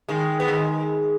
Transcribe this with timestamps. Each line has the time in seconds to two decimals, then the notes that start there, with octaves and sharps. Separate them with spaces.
0.08 D#3 G#3
0.40 B3
0.48 D#3 G#3